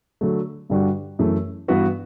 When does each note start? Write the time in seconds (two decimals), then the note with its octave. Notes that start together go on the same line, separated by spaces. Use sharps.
0.21 D3 F#3 A3
0.70 G2 D3 G3 D4 F#4
1.19 F#2 E3 A3
1.68 G2 E3 B3 F#4 B4